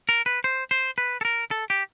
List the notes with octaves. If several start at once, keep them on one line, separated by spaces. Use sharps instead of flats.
A#4
B4
C5
C5
B4
A4
A#4
A4
G4